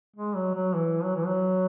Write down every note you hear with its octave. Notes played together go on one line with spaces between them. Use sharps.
G#3
F#3
F#3
E3
F#3
E3
F#3